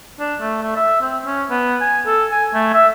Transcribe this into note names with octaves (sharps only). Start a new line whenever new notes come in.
D4
A3
A3
E5
C4
C#4
B3
G#5
A4
G#5
A3
E5